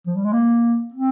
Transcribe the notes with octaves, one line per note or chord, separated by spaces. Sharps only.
F3
G3
G#3
A#3
C4